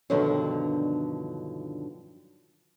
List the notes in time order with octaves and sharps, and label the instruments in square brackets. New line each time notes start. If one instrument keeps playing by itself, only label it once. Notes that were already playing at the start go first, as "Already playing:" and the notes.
[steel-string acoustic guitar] G2 B2 D3 D#3 F3 F#3